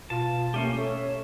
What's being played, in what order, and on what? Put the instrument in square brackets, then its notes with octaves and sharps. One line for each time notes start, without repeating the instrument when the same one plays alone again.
[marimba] B2 [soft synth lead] F4 [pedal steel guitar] A5
[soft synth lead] A3 [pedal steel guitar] A#3 C#4 G4
[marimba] C#4 A4 [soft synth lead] C#5 [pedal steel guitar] E5